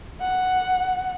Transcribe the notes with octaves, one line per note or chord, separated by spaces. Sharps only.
F#5